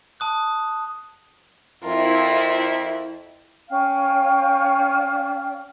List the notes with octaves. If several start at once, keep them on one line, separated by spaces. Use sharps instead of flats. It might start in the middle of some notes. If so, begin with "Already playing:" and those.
A5 D#6 F#6
F2 E4 F4 A#4
C#4 F5 G5 F6